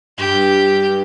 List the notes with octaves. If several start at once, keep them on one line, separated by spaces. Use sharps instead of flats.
G2 G4